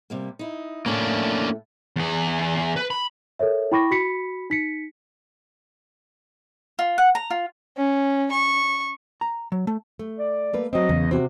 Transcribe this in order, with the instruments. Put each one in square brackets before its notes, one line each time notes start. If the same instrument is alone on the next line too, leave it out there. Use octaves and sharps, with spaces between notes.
[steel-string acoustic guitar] C3 G3 A#3
D#4 E4
[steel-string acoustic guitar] A2 A3 [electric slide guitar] A#3 C#4 D4
[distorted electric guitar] E2 G#4
B4
B5
[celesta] A4 A#4 C#5 E5
E4 G5 B5 C#6 D6 A#6
F#4 B5 B6 C#7
D#4 B6 C#7
[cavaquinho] F4
F#5
A#5
F4
[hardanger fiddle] C#4
C#6
[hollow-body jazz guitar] A#5
F#3
A3
[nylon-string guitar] A3
[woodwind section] D5
[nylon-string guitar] A3 A#3 B4
[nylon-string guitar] F#3 C4 [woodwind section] D#5
[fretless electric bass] E2 [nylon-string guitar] C#3
[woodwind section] C3 [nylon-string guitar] C4 F#4